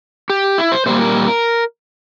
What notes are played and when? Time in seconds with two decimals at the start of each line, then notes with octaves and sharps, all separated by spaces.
0.30 G4
0.58 E4
0.72 C5
0.86 A#2 G3 A#3 C5
1.01 A#4